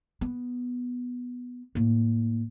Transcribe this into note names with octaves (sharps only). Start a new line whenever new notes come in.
B3
A2 A#3